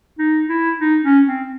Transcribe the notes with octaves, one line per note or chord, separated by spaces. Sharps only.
D#4
E4
D#4
C#4
C4